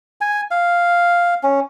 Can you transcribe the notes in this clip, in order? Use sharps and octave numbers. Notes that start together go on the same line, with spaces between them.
G#5
F5
C#4